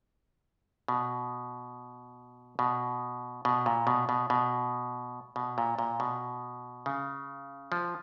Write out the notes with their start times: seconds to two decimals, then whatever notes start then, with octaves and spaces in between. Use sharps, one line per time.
0.88 B2
2.59 B2
3.45 B2
3.66 A#2
3.87 B2
4.09 B2
4.30 B2
5.36 B2
5.58 A#2
5.79 A#2
6.00 B2
6.86 C#3
7.72 F3